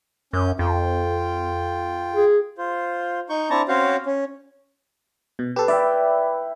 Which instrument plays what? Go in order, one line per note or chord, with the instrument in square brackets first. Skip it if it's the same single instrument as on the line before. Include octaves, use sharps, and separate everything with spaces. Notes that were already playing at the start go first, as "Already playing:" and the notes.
[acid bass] F#2 [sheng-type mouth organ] C#4 G6
[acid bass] F2 [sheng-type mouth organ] F4 G5
[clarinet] G#4
[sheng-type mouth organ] F4 C5
D#4 C#6 G6
C4 D4 E4 A5 A#5 C#6
C4 C#4 F#4 C5 C#5 F5
C#4
[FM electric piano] B2
[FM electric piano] G4 A4 [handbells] B4
[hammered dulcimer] E4 G5 [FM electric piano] D5 E5